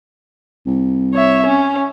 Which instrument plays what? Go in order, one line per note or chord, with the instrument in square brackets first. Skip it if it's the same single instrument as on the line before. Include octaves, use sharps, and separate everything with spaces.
[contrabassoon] C2
[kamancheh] C#5 E5
C#4